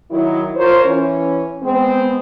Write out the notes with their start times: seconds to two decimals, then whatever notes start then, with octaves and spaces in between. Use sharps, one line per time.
0.11 D#3 F#3 E4
0.56 F4 A#4 C5 C#5
0.85 E3 C#4
1.63 G#3 B3 C4